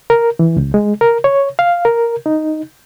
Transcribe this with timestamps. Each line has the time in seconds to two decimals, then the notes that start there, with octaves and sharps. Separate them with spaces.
0.10 A#4
0.39 E3
0.56 C#2
0.74 G#3
1.01 A#4
1.24 C#5
1.59 F5
1.85 A#4
2.26 D#4